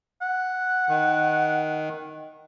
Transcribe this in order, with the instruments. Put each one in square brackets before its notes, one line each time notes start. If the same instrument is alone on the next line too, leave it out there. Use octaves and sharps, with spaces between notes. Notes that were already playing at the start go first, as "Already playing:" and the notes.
[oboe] F#5
[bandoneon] D#3